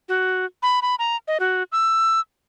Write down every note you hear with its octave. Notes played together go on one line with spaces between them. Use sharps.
F#4
B5
B5
A#5
D#5
F#4
E6